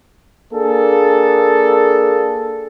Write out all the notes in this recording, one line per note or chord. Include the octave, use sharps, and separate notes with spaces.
A#3 D4 G#4 A4